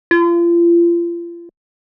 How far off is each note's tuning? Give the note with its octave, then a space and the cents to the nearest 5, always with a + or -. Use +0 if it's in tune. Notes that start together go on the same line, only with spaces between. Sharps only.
F4 -35